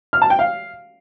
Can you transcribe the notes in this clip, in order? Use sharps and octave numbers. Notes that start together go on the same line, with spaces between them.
F6
A5
G5
F5